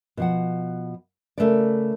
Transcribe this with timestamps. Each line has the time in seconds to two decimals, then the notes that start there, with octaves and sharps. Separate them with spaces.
0.17 B2 F3 F#5
1.38 C#3 E3 A3 A#4 B4 D5